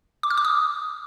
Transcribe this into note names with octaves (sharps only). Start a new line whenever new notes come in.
D6
F6
D6
D#6